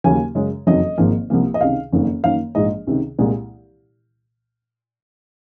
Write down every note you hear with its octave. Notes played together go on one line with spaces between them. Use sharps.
D#2 C#3 F#3 A#3 G#5
F#2 C#3 G#3
F#1 F2 D#3 F#3 D#5
G#1 G#2 F3 A#3
C2 C3 F3 A#3
D#5
C#2 C3 D#3 F5
F#1 F2 D#3 A#3
F#2 D#3 A#3 F5
A#1 G#2 F3 G#3 D#5
C#2 C3 D#3
C2 A#2 G#3